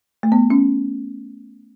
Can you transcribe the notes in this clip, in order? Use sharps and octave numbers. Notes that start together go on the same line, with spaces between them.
A3
B3
C#4